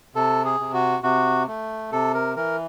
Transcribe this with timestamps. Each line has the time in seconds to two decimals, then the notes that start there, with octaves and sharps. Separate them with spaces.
0.15 C3 A4
0.45 G#4
0.60 C3
0.73 F#4
1.03 C3 F#4
1.48 A3
1.92 C3 A4
2.14 A#4
2.36 E3 A#4